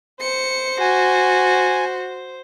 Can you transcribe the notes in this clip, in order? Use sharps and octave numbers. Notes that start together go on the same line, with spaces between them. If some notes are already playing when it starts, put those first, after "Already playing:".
C5 C#7
F#4 G#5